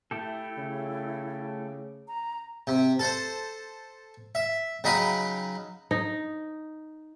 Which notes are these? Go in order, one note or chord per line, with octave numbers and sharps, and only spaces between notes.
A3 E4 G4 A4
C#3
A#5
C3
A4 C5
E5
C#3 F#3 D#4 G5 B5 D#6
D#4